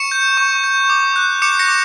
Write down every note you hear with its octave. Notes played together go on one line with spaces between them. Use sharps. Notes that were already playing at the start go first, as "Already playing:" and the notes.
Already playing: C#6 C#7 E7
G6
C#6
G6
D6
F#6
D6 C#7 E7
A#6 C#7
D6